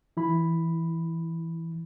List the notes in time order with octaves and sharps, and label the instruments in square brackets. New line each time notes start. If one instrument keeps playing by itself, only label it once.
[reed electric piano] E3 E4 B5